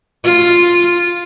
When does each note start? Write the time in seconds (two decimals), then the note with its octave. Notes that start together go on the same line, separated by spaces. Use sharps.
0.24 F4